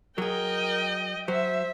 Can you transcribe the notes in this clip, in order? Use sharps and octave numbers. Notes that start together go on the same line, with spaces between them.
F#3 G#4 A#4 D#5 G5
F#3 C5 E5